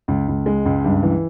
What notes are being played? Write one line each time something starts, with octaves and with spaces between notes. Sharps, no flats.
C#2
C#2
G#3
C#2
G2
E3